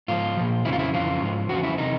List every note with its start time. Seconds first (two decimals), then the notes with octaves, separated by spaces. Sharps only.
0.08 G#2 F3 F4
0.37 A#2 F3
0.65 F2 C#3 F3 E4
0.73 F4
0.79 E4
0.93 F2 C#3 E3 F4
1.22 G#2 F3
1.49 E2 C#3 F3 F#4
1.64 E4
1.78 C3 E3 D#4